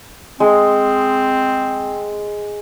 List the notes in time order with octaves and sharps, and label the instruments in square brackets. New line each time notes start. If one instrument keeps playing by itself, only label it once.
[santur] G#3 [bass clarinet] C4